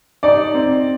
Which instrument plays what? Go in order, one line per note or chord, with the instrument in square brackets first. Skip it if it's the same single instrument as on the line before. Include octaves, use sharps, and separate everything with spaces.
[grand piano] D#4 [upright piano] D5
[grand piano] C4